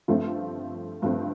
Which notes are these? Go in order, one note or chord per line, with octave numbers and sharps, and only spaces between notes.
G2 F3 A3 C4 F4
G2 F3 A3 C4